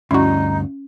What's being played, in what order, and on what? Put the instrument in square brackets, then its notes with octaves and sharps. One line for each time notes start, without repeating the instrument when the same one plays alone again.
[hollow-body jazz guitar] D2 G2 [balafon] C#4 [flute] D#4 [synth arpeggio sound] E4 F#4